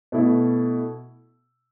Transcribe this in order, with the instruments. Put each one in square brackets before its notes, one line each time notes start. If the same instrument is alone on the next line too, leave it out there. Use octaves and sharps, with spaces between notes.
[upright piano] B2 A3 E4